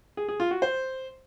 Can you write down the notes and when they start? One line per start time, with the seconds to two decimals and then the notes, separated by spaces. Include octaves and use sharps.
0.17 G#4
0.29 G#4
0.40 F4
0.51 F#4
0.62 C5